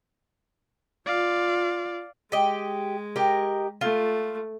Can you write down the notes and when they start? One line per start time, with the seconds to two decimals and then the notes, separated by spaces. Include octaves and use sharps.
1.06 F4 D5 F5
2.32 G#3 G4 D#5
3.16 G4 A#4 D#5
3.81 A3 F4